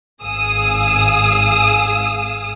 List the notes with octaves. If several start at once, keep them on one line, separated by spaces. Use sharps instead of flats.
G#1 G#4 F5 D#6 E6